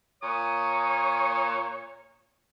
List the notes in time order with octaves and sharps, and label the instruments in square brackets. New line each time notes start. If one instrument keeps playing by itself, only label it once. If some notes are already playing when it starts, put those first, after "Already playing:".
[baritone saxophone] A#2 [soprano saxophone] C#5 [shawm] D#6